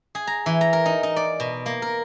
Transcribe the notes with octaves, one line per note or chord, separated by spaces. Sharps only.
G#4
A#5
E3
A#5
A#4
D#4
D#4
D5
B2
A#3
A#4